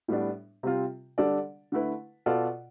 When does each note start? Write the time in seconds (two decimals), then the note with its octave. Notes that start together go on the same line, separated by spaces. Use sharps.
0.08 A2 G3 B3 D4
0.63 C3 G3 C4 F4
1.18 D3 G3 D4 A4 D5
1.72 D3 A3 E4 B4
2.26 B2 B3 F4 A4 D5